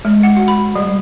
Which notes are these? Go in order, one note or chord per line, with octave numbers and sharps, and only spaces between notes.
G#3
F#5
F#4
B5
G3